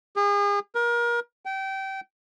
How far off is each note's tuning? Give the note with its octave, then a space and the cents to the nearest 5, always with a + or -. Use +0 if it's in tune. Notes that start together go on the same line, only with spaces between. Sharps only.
G#4 -40
A#4 +30
G5 -25